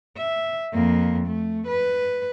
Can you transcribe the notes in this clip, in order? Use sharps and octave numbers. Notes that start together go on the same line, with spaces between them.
E5
F2 A#3
A3
B4